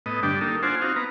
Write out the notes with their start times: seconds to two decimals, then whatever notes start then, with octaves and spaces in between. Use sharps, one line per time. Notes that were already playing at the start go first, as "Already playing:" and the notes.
0.06 A2 B3 D#5
0.23 G2 D3 D4 G5
0.41 A#3 D#4 A4
0.63 D4 F4 C5 F#5 G#5
0.82 C4 D#4 F#4 F5
0.96 B3 A#5